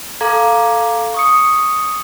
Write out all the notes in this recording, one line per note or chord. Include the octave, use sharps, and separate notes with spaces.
A4 F5 A#5 D6 G#6
C#6 D#6 C#7